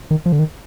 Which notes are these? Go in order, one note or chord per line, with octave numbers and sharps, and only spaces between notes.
D#3
F3
D3
D#3